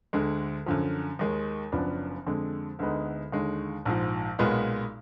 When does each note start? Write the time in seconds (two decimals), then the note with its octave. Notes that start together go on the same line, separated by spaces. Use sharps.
0.13 D2 D3 G#3
0.66 F#2 D3 F3
1.19 D#2 D#3 G#3
1.72 F#1 F#2 F3 B3 D4
2.26 F2 D3 G#3
2.79 D2 D3 G#3 B3 D#4
3.32 D#2 D3 G#3
3.85 A#1 G#2 F3
4.39 B1 A#2 G#3 B3 F4